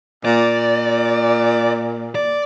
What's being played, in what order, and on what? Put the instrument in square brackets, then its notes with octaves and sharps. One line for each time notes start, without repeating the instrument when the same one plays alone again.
[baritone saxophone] A#2 [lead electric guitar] D5
[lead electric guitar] D5